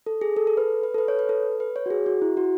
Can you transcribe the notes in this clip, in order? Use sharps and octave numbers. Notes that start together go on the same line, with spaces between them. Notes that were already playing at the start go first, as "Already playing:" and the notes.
A4
G#4
A4
A4
B4
B4
A4
B4
C#5
B4
A4
B4
C#5
F#4
G#4
F#4
E4
F#4